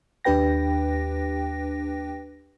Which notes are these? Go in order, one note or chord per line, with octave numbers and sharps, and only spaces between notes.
D#2 D4 G4 B4 G5 A#6